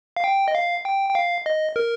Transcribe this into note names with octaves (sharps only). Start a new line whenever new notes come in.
F5
G5
D#5
F5
G5
G5
F5
D#5
A#4